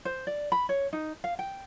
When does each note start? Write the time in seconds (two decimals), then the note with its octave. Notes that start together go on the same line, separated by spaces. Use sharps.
0.05 C5
0.27 D5
0.52 B5
0.69 C#5
0.93 D#4
1.24 F5
1.39 G5